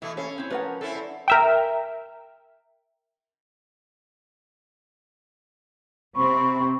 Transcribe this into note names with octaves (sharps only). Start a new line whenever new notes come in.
B2 E3 A3 E4
C#4 A4 C#5 F5
C4 E4
F3 A#4 B4 C#5 F#5
C4 C#4 E4 A4
D4
A#4 E5 G5
C3 C4 B5 C#6